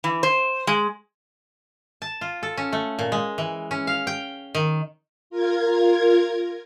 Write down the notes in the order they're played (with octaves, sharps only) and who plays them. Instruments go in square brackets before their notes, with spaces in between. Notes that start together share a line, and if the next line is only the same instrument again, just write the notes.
[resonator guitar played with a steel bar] E3
C5
G#3
[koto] A5
F4
A4
C#4
A3
A#2
G#3
E3
C#4
F5
G5
D#3
[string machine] F4 A#4 G#6